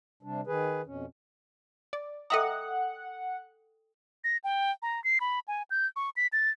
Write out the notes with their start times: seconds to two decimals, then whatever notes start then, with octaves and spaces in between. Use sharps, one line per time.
0.23 C3 G3 D4
0.47 D#3 G#4 B4
0.86 F2 B2 C#4
1.93 D5
2.30 A4 D#5 E5 F#5 G5 A#5 D#6
4.24 A#6
4.44 G5
4.82 A#5
5.04 C7
5.20 B5
5.48 G#5
5.70 G6
5.96 C#6
6.17 B6
6.33 A6